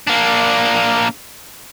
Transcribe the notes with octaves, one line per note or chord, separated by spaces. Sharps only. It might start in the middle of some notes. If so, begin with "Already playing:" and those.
A#3 D4